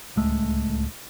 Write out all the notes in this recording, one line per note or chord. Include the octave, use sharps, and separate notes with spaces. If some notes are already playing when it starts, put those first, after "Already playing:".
D1 C#2 G#3 A3